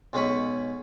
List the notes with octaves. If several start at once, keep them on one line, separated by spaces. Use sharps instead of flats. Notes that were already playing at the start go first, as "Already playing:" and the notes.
B1 G#3 C#4 G#4 B5 C#6